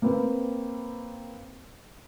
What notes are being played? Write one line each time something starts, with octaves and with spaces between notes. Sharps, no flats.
A#3 C4 B4